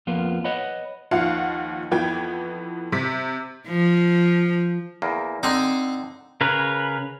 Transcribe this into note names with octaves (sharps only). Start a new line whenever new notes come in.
F2 F3 A#3 B3 F4
B4 C#5 D#5 F#5 B5
D#2 D#3 F3 F5 F#5
F2 E3 B3 G5 G#6
C3 B6
F3
E2 A#3
D3 C4 D#4 C5
C#3 A#4 B4 C#5